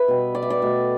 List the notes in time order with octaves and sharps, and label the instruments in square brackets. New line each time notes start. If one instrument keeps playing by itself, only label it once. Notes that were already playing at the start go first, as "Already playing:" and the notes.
Already playing: [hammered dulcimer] B4 E5
B2 G3
D5
E5
D5
B2 A3